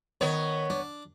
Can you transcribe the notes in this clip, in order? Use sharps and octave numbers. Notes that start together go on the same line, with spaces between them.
D#3 B3 C#5
D4